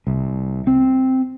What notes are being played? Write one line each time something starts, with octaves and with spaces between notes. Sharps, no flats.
C2
C4